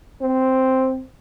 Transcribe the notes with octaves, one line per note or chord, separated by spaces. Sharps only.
C4